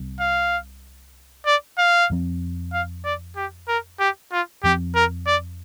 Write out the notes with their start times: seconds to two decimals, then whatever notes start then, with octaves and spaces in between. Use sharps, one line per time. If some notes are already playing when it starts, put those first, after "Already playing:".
Already playing: C2 C3 G3
0.20 F5
1.46 D5
1.78 F5
2.10 F2 F3 C4
2.73 F5
3.05 D5
3.36 G4
3.68 A#4
4.00 G4
4.32 F4
4.63 F2 F3 C4 G4
4.95 A#4
5.27 D5